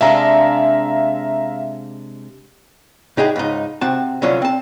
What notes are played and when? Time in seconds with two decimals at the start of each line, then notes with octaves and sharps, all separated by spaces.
0.01 C3 G#3 D4 E5 F5 A#5
3.17 A2 D#4 G4 G#4 F#5
3.36 C#2 G#2 D#4
3.81 C3 C4 F#4 A5
4.22 C2 D3 F#3 C#4 F4 C#5
4.42 C4 A5